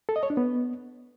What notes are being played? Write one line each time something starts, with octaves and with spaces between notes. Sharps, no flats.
A4
D#5
C#5
D4
B3